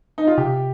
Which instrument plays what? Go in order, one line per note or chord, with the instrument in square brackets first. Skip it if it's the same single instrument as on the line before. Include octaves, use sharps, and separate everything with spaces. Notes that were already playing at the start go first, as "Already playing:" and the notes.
[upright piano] D#4
F4
[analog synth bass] C3 [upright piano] G4